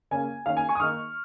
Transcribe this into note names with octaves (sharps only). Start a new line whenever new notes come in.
C#3 A#3 C#4 G#5
D#3 A#3 C#4 F5
G#5
G#5 C#6
D#6
D#3 A#3 D#4 C#6 F6